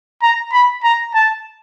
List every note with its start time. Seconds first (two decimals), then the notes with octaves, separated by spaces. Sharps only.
0.22 A#5
0.53 B5
0.83 A#5
1.14 A5